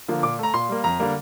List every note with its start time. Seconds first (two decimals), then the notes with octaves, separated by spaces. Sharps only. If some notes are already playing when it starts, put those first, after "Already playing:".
0.08 D3 F3 A#3
0.23 A#2 D6
0.39 A3 A#5
0.54 A#2 C6
0.69 G3 A#3
0.84 F2 A#5
1.00 D3 G3 A#3